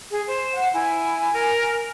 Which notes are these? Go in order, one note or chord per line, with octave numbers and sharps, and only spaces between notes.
G#4
C5
F#5
E4 G#5
A#4